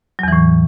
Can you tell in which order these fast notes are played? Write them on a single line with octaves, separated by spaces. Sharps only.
F#3 E2 E3 A2